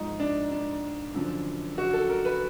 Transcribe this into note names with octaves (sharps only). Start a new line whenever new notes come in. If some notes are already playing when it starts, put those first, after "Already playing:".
Already playing: G#2 F3 D#4
D4
D4
F#2 D3 F3
F#4
A4
A#4
B4